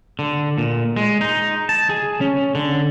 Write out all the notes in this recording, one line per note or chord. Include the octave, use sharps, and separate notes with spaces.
D3
A#2
G#3
D#4
A5
G#4
C#4
D3